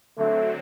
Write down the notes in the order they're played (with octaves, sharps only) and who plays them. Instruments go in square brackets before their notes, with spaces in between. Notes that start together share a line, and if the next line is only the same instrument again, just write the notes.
[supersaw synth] D3 F#3 C4 [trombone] A3